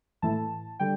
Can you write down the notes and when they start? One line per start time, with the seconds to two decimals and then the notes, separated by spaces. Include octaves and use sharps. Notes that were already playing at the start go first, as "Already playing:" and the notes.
0.22 A2 E3 A3 E4 A5
0.80 D3 G3 G5